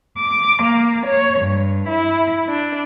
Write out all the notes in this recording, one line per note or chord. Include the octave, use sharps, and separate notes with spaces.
D6
A#3
C#5
G2
E4
D4